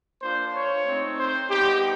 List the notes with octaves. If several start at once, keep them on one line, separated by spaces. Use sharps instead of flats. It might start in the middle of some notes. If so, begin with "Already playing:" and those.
A#3 D4 F4 C5
C#5
A3 C4 D#4
C5
G3 B3 D#4 G4